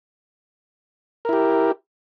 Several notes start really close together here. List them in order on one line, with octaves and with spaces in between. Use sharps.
A#4 E4 G4